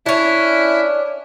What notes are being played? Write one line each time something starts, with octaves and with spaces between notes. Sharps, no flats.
C#4 D4 E4